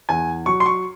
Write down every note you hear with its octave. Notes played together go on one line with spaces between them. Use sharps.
E2 G#5
F#3 C#6
C6
C#6